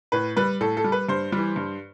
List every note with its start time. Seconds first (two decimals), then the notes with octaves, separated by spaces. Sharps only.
0.12 A2 B4
0.36 G3 B4
0.61 A2 A4
0.77 A4
0.84 G3
0.92 B4
1.09 G2 C5
1.32 E3 G3
1.56 G2